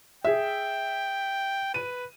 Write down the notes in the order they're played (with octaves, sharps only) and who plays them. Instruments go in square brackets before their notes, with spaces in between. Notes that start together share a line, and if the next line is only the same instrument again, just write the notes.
[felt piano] G#4 E5 [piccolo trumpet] G5
[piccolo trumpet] B4 [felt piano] D#7